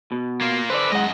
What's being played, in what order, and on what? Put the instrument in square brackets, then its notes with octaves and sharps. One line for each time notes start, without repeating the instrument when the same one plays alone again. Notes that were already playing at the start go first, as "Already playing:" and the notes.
[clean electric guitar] B2
[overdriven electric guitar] A#3 F4
[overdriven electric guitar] D3 B4 [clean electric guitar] C5 D5
[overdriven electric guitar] F#2 D#5 [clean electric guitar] G#3 F#5